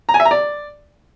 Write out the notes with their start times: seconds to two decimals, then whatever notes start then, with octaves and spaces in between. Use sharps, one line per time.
0.09 A#5
0.14 G#5
0.20 E5
0.25 A#5
0.31 D5